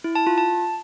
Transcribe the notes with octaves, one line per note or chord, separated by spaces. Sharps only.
E4
A5
F4
A5